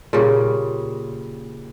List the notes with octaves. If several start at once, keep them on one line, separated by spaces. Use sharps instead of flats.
A#2 C#3 G3